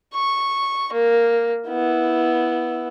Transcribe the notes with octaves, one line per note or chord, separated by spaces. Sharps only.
C#6
A#3
B3 E4